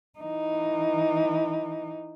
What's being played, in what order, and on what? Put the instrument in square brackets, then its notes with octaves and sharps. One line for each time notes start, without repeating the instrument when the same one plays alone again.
[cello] E3 D#4